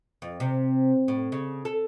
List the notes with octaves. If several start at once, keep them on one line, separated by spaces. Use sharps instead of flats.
F2
C3
A2
C#3
A4